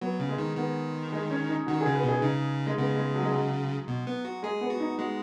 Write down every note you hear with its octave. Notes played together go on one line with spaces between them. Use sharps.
F#3 B3
C#3
G#3
D#3
D#3 B3
G#3
C#4
D#4
D#3 F#4
G#4
C#3
B4
B2
G#4
C#3 D#4
G#3
C#3 B3
G#3
F#3
G#3
F#3
B2
B3
F#4
G#3 G#4
B3
F#4
D#4
G#3 F#4